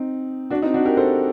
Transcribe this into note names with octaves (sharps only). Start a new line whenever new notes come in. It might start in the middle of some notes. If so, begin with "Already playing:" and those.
Already playing: C4 D#4
D4 F#4
C4 D#4
D4 F#4
G4 A#4
A4 C5